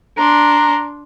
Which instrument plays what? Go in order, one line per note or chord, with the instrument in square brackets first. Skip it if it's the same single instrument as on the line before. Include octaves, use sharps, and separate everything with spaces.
[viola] D4 C6 [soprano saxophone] A#5